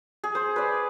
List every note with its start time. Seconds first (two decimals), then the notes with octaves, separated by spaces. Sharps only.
0.24 G#4
0.35 C5
0.56 B4 D5